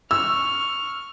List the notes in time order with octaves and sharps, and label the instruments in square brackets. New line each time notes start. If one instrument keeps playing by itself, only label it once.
[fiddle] C#6 F6 [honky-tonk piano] E6